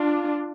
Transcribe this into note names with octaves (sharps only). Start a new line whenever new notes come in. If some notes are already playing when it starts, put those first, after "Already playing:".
Already playing: D4 F4